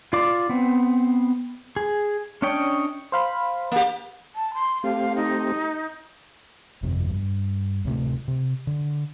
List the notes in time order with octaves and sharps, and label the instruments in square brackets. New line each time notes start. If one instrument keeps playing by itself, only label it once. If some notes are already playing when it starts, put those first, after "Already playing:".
[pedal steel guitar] F4 D5 F5 D6
B3 C4
G#4
C#4 D4 C#5 D#5 G5
[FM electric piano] C5 F5 B5
[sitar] A#3 G4
[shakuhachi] A5
C6
[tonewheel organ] A3 C4 G4 [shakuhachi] F5
[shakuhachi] D#4
[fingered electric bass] G1 F2 C3
G2
D1 C3 A3
C3
D3